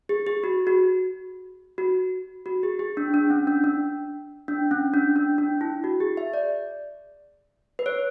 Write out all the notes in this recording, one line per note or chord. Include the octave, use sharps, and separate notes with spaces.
G#4
G#4
F#4
F#4
F#4
F#4
G#4
G#4
D4
D4
C#4
D4
D4
D4
C#4
D4
D4
D4
E4
F#4
G#4
E5
D5
B4
C#5